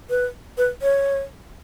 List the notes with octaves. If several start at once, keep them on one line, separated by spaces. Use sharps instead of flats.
B4
B4
C#5